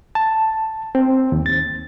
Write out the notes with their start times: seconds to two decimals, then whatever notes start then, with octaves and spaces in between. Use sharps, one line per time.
0.15 A5
0.95 C4
1.32 D#2
1.46 A6